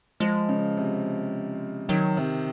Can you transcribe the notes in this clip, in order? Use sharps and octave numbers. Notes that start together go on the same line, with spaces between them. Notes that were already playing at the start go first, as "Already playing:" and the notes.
F3 G#3
C#3
C3
D#3 F#3
C3